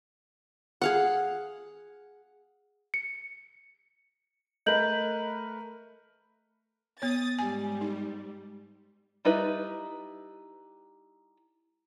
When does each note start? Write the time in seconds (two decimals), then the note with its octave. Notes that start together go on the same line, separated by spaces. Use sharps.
0.82 G#4 F5 F#5
2.94 C#7
4.66 A3 A#4 B4 D#5 G6 F#7
7.02 B3 C#5 D#6 A6
7.39 G#2 G3 G#5
7.81 D#4
9.25 G3 D#4 E4 B4